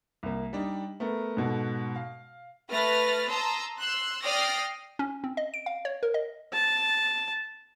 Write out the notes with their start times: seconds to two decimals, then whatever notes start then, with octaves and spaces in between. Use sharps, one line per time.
0.23 C2 A#3
0.53 G3 D4 D#4
1.00 A3 B3 A#4
1.37 G#2 B2 F#4 A4
1.96 F5
2.70 A3 B4 F6 A6 A#6
3.29 A5 A#5 C6 D#6 E6
3.78 C6 E6 F#6
4.23 D5 G5 D#6 F6 A#6 C7
4.99 C#4
5.24 C4
5.37 D#5
5.54 D7
5.66 F5
5.85 C#5
6.03 A#4
6.14 D#5
6.53 A5